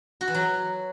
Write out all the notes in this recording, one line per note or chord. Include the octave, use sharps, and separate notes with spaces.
F#4
E3
F#3